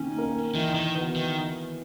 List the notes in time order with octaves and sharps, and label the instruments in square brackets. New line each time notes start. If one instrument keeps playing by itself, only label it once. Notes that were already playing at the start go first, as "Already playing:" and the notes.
Already playing: [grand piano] D#3 A#3 D#4 [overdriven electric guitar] C#4
[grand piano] A#3 D#4 A#4
[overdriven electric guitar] D#3 [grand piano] E3
[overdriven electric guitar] D#3
[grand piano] B3 F#4 B4
[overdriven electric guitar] D#3